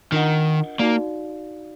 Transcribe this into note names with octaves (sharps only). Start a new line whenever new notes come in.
D#3 D4 F4 A#4 D#5 F#5
A#3 D#4 F#4 D5 F5